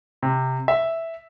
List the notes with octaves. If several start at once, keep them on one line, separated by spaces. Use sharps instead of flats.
C3
E5